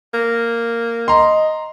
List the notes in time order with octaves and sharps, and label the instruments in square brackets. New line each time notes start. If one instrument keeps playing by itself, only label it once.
[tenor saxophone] A#3
[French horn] D#5 [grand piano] A#5 C6